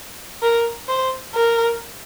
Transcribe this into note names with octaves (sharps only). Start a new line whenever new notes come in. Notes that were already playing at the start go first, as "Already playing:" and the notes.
A#4
C5
A#4